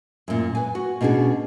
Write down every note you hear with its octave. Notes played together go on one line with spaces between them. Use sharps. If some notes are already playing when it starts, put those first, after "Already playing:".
F#2 A#2
B4 G#5
F#4
B2 C#4 D4 F#4 G#4